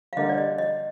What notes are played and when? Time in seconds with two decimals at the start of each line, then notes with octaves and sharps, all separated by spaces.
0.13 F5
0.17 D3 G3 A#3 D#5
0.29 D5
0.38 D#5
0.58 D#5